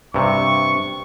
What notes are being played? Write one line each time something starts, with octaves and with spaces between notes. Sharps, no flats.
G2 C3 C#6